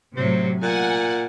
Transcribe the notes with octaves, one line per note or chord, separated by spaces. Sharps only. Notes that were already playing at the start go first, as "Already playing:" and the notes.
A2 C3 F#3 C4
A#2 F#5 G#5